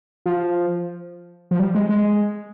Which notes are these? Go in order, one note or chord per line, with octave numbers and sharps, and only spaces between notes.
F3
F3
G3
G#3
G#3